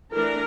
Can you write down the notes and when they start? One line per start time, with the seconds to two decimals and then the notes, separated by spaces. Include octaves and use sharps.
0.14 E3 A3 D4 A#4